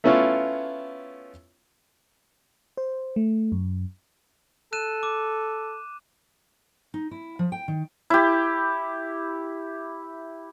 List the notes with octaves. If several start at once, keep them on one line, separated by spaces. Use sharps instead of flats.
A3 B3 C#4 E4 F4 C#5
C5
A3
F#2
A4 F#6 D#7 E7
D6
D#4
E4
F3
G5
D#3
E4 G4